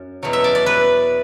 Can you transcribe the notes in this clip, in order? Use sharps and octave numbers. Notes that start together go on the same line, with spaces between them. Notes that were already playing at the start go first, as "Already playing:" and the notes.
Already playing: F#2
E2 B2 F#3
E5
D5
D5
B4